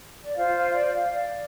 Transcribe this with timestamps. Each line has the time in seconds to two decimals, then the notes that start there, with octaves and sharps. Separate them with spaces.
0.23 D5
0.35 F4 C5 F5
0.54 F5
0.73 D5
0.93 F5
1.11 D5